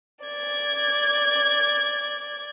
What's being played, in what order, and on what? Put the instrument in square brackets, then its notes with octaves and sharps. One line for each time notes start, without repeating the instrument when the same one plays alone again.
[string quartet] D5 G#6